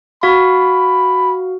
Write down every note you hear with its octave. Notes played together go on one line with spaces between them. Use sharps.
F#4 F5 B5